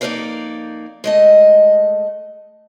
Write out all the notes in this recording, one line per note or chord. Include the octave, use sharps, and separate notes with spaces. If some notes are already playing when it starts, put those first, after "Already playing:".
F2 A#3 D#4 B4 D5 F5
G#3 A3 D#5